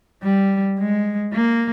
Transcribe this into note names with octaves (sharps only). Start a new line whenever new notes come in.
G3
G#3
A#3